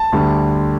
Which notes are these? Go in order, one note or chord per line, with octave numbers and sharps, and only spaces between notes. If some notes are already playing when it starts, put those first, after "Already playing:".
Already playing: A5
D2 D3 G3